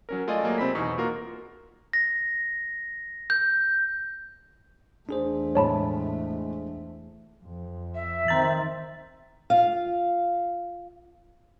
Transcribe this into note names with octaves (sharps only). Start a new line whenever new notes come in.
F#3 C#4 A#4
G#3 A3 F4 D5 D#5 G#5
F#3 A#3 G#4
C3 C4 B5 B6
E2 B2 D#4 C#6
A#3 F4 F#4 A#4
A#6
G6
E2 A3 D4 G#4 C5
A2 G#3 C#5 A5 B5
F2
E5
D#3 C4 A#5 A6
F4 F5